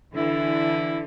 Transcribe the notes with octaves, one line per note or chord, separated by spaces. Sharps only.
D3 E3 E4